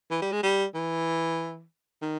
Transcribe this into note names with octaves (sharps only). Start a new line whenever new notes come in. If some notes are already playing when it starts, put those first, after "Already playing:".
E3
G3
G#3
G3
E3
D#3